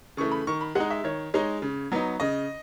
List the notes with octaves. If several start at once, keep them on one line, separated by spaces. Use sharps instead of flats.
C#3 E3 A3 C#6
B5
D#3 C#6
B5
G#3 D#4 F#5
E5
D#3 C#5
G#3 D#4 C#5
C#3
F#3 B3 D#4
C#3 D#5